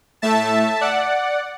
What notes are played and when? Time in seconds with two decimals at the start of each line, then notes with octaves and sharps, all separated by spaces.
0.22 A2 A3 E5 A5
0.81 D5 F#5